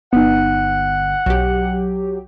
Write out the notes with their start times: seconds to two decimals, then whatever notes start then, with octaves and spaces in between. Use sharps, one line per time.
0.13 G1 B3 D#4 F#5
1.26 B1 F#3 G4